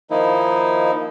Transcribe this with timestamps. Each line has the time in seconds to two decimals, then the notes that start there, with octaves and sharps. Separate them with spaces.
0.11 D#3 F3 A#3 D#4 E4